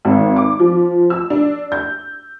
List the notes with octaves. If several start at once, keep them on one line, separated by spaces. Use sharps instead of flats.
G#1
D6
F3
E6
D4
G6